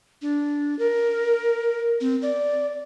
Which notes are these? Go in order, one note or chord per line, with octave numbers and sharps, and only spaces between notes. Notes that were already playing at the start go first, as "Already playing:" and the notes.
D4
A#4
C4
D5